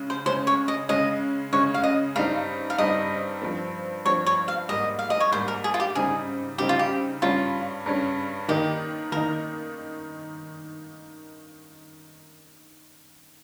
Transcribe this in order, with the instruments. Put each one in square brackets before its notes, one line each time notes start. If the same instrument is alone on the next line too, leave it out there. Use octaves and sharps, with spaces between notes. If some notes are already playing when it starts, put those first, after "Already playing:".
Already playing: [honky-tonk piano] C#3 G#3 C#4
[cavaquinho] C5
[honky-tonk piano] C#3 G#3 C#4 [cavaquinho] C5
[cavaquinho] C#5
D#5
[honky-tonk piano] C#3 G#3 C#4 [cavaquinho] D#5
[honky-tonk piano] C#3 G#3 C#4 [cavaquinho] C#5
[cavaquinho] F5
D#5
[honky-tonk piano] G2 G3 C4 D#4 [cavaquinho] F5
[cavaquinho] F5
[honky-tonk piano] G2 G3 C4 D#4 [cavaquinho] D#5
[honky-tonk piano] G2 F3 C4
[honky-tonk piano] G2 F3 C4 [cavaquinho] C#5
[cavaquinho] C#5
F5
[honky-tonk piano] G#2 G3 A#3 [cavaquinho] D#5
[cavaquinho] F5
D#5
C#5
[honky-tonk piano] G#2 G3 A#3 [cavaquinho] C5
[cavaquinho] A#4
G#4
F4
G4
[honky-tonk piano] C#3 G3 C4 D#4 [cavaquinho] G#4
[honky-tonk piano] C#3 G3 C4 D#4 [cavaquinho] G4
[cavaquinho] F4
G4
[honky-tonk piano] G2 G3 C#4 [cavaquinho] F4
[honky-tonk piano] G2 G3 C#4
[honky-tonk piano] D#3 A#3 D#4 [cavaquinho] G4
[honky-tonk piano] D#3 A#3 D#4 [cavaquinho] A#4